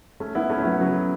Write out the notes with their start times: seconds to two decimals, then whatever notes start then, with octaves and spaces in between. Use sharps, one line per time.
0.20 A3 C#4
0.35 B3 E4
0.50 A3 C#4
0.60 C#4
0.64 F#3 B3
0.80 C#3 F#3
0.95 C#3